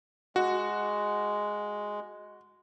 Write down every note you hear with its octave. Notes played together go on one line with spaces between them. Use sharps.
G#3 F#4